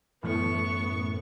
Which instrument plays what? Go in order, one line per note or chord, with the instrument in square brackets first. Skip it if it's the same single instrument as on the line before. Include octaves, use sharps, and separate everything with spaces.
[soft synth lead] F#2 [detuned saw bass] A2 [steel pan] E3 A3 [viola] B3 C#6